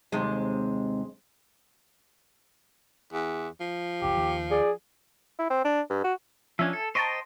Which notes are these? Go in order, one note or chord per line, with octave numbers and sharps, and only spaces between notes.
D#2 C3 G#3
E2
F3
F#1 C#2 G4
D#2 D#3
G#4 D5
E4
C4
D4
G2
F#4
F3 C#4 D4 E5 G#5
A4
C5 D#5 G5 A5 A#5 C#6